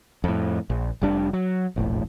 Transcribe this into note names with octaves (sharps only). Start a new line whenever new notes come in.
F2 A2
A#1
F1 G3 D4
F#3
E1 A#1 A2